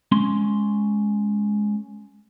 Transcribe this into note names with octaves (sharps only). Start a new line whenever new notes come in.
G#3 C#4 C6